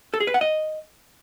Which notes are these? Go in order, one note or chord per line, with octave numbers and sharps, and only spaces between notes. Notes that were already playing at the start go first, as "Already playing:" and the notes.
A4
G#4
B4
F#5
D#5